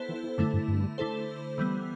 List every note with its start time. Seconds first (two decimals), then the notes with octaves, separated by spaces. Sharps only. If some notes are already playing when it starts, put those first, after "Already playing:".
Already playing: B3 E4 A4 C5
0.09 E3
0.23 E3
0.38 F#2 D3 A3 E4
0.53 G2
0.68 G2
0.98 D3 A3 E4 A4 C5
1.58 E3 G3 B3